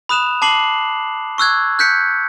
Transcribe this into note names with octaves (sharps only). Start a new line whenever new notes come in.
B5 D#6 F#6 E7 F7
A5 D6 C7 F#7
C#6 E6 F#6 G#6
F#6 G6 B6 C#7